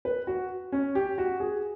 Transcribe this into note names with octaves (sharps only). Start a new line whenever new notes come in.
B4
F#4
C#4
G4
F#4
G#4